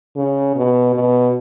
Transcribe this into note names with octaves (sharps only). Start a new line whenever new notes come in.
C#3
B2
B2